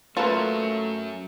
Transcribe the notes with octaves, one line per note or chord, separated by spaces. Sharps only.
F#3 A3 A#3 C#4 F4 A4 B4 A5